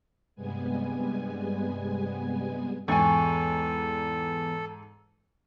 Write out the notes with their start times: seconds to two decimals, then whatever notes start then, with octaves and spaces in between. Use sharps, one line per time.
0.35 G2 C3 G3 G#3 B3 G#5
2.88 E2 G#2 A4 G5 G#5 C#6 A6